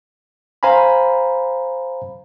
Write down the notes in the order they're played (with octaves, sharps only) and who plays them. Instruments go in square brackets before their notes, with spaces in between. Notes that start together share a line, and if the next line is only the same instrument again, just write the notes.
[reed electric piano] C5 F5 G#5 A#5 B5